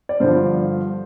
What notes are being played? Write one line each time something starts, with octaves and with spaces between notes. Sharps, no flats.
D5
G2 D3 F3 C5